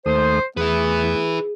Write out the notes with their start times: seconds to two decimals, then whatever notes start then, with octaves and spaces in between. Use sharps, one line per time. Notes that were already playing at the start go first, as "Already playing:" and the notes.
0.06 D#2 A3 C5 D#6
0.57 E2 A3 B3 E4 G#4 B4